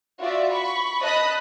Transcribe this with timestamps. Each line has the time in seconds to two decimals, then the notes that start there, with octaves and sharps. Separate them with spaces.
0.22 F4 F#4 D5 E5
0.52 B5 C#6
1.02 D#5 A5 B5 D#6 F#6